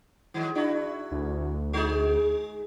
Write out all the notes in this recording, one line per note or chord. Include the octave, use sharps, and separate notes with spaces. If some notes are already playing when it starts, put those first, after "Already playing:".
D#3 F#3 G#3
D4 E4 F#4
D2
G#3 D#4 G#4